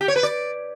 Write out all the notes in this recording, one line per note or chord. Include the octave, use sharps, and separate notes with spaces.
G4
C#5
B4
D5